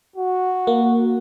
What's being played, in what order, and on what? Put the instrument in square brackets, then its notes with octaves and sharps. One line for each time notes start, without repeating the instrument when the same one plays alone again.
[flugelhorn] F#4
[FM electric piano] A#3